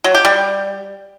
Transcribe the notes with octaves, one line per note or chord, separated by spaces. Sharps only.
F#3
G4
G3